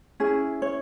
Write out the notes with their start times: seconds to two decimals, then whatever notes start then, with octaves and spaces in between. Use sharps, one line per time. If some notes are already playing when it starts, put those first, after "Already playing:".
0.20 C#4 E4 G#4
0.62 C#5